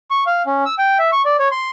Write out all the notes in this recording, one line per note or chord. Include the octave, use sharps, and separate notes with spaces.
C#6
F5
C#4
E6
G5
E5
C#6
D5
C#5
C6